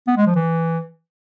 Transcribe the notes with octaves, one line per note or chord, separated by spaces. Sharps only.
B3
G#3
F3
E3